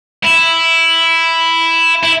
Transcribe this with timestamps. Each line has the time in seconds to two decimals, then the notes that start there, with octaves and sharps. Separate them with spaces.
0.24 E4
2.03 E4